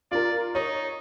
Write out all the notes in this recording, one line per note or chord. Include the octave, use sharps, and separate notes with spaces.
F4 A#4 D5
D#4 C#5